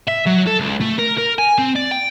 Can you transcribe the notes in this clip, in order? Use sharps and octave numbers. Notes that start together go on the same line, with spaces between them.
E5
F#3
A4
C#2
A3
A#4
A#4
G#5
C4
D5
G5